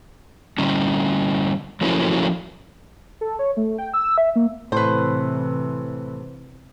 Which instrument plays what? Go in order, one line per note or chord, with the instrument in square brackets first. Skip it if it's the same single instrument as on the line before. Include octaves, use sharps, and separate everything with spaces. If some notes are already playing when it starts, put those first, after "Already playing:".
[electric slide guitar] D3 G3 C#4
F3 F#3 A3 A#3 C#4 E4
[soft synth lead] A4
C#5
A3
G5
E6
E5
A#3
[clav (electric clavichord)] A2 [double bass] C3 E3 [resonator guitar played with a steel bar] B4 C5